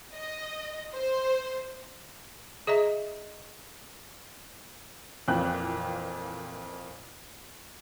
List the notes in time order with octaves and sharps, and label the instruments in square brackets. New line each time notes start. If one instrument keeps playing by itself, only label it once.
[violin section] D#5
C5
[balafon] G#4 D#5 E5 A#5
[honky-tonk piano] F2 A#2 E3 G5 F#6